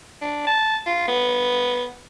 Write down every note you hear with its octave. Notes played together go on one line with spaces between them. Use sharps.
D4
A5
F4
B3